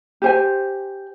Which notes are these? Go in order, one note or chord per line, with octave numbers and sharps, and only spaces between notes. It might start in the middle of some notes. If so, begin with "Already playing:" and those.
G4 C5 G#5